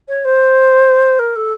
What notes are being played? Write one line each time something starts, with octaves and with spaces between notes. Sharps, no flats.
C#5
C5
A#4
A4